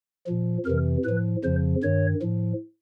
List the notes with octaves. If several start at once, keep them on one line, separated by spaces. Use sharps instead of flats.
A#2 F3
F2 C3 E3 A#4
A2 F3 B4
F2 C#3 F3 C5
G2 D#3 C#5
A2 F3